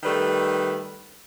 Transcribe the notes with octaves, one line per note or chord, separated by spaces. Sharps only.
D#3 G3 A3 B4